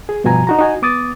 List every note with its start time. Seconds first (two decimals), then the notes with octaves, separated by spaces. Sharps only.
0.09 G#4
0.24 G2 B2 F3 F#4 G#5 A#5
0.47 D#4 F#4 A#5
0.59 D#4 F#4 G#5
0.82 B3 D6 D#6 A6